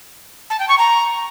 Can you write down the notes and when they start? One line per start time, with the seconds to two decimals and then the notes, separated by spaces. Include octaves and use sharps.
0.50 A5
0.59 G5
0.69 C#6
0.78 A#5